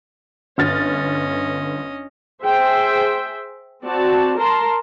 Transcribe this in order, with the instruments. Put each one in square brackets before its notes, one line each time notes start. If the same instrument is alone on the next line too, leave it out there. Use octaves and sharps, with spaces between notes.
[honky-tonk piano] G1 F6 A6 [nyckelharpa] C#4 D#5
[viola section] G#4 C5 E5 G5
C4 F#4 D5 A5
A#4 A5 A#5 C6